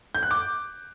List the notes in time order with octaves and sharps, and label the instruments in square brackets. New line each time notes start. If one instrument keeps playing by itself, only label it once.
[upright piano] G6
F#6
D6